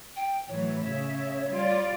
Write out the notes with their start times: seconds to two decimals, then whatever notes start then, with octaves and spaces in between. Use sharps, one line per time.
0.16 G5
0.49 A2 E3 F#3 C#5
0.83 C#3 C#5 E5
1.50 G3 F4 D5